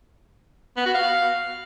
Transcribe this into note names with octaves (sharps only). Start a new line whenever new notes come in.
B3
F#4
F5